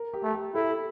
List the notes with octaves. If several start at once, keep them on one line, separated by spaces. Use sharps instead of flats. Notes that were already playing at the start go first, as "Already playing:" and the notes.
Already playing: A#4
G4
A3
G4
E4 A4